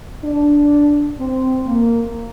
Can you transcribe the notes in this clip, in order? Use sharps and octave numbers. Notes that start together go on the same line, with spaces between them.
D4
C4
A#3